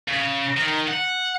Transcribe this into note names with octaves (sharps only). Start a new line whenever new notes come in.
C#3
D#3
F#5